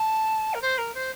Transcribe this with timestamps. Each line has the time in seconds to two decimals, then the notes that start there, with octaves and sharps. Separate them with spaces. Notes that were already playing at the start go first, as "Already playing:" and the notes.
Already playing: A5
0.54 A#4
0.61 C5
0.78 A#4
0.94 C5